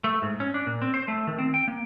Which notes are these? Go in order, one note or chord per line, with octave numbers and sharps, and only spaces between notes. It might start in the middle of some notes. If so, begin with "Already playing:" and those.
A3
G#2
C#4
D4
A#2
C4
C5
A3
D#3
C4
G5
A#3